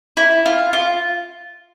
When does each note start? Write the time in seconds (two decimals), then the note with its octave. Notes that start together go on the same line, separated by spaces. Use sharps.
0.17 E4
0.46 F4
0.73 F4